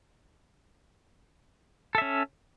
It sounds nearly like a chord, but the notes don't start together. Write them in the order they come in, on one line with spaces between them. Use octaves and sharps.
A4 E5 C#4